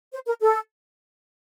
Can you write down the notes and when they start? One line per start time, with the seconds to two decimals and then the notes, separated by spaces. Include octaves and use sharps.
0.12 C5
0.26 A#4
0.40 A4